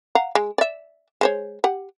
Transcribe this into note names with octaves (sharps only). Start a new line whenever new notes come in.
F5 F#5 A#5
G#3
D5 E5
G#3 C5 C#5
G4 F#5